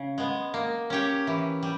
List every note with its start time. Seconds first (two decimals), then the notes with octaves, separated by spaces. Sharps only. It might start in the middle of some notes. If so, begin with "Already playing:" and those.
Already playing: C#3
0.18 G#3 B3
0.54 A#3
0.90 C#4 G4 C#5
1.27 E3
1.63 G3